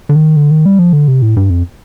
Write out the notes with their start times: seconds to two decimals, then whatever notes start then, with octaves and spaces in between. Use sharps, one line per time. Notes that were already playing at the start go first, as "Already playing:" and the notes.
0.09 D3
0.15 D#3
0.36 D3
0.51 D#3
0.66 G3
0.79 F3
0.93 D3
1.08 C3
1.22 A2
1.37 G2
1.50 F2